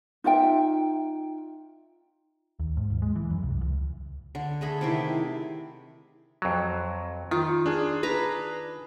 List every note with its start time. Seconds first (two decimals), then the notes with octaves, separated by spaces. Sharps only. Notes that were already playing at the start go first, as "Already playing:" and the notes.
0.24 D#4 F4 E5 G5
2.60 D#2
2.77 G#2
2.90 D#1
3.02 G#3
3.16 E3
3.31 F#2
3.43 C2
3.61 C#2
4.35 D3
4.61 A3 G#4 A4 B5
4.81 C3 D#3 E4
6.42 F2 F#3
7.31 D#3 F4
7.66 D4 G#4
8.03 B4 A#5